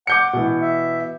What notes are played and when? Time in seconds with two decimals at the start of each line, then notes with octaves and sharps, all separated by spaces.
0.07 F#5 D6 G6 C#7
0.33 B2 E3
0.62 E5